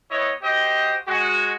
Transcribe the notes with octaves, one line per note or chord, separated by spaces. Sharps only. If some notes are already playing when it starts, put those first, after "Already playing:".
B3 E4 C#5 D#5
F#4 G4 C5 D#5
G#3 F#4